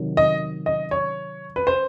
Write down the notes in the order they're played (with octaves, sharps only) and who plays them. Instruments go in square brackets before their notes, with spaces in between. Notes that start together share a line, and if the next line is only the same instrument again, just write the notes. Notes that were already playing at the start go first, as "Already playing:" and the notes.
Already playing: [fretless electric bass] C3 D#3 F#3
[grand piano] D#5
D#5
C#5
B4
C5